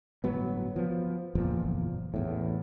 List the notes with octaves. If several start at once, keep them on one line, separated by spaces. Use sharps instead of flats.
G1 A2 F#3 B3
F3 B3
F#1 E2 A#2 F3
A1 E2 A2